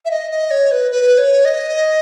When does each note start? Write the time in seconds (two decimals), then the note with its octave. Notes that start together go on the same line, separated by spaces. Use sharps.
0.05 E5
0.11 D#5
0.31 D#5
0.51 C#5
0.72 B4
0.91 B4
1.18 C#5
1.45 D#5